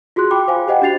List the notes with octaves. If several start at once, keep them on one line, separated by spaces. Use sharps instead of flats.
F4 F#4 G#4 C6 F#6
G5 B5 D6
C5 F5 G#5
G4 C5 D#5 F#5 G5
D4 F#4 A6 C7 F7